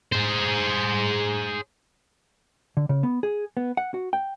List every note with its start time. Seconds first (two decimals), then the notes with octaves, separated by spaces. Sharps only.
0.12 G#4 C5
2.77 D3
2.89 C#3
3.03 B3
3.23 G#4
3.57 B3
3.77 F#5
3.94 F#4
4.13 G5